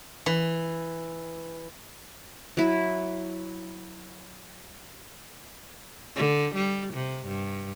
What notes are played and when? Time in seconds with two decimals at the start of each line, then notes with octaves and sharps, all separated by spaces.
0.26 E3
2.57 F#3 E4
6.16 D3
6.56 G3
6.94 C3
7.27 G2